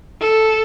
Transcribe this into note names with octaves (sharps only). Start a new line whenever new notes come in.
A4